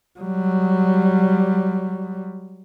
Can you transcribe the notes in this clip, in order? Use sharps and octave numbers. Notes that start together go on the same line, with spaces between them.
F#3 G3